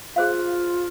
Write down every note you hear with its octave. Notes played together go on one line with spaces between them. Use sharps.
F4 G#4 C5 F5